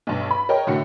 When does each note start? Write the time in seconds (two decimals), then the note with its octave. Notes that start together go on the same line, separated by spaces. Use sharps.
0.07 B1 G2
0.31 B5
0.49 A#4 C#5 D#5 G5
0.67 A2 D3 F#4 C#7